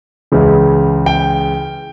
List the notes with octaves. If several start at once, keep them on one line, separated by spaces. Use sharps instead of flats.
C#2 C#3 E3
G5